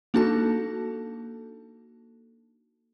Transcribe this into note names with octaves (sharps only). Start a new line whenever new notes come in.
A#3 D4 D#4 F#4 A4 A5